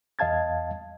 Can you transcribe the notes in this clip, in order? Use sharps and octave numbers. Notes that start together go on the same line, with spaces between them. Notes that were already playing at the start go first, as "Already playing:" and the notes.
E2 D#5 F5 A5 G#6 A6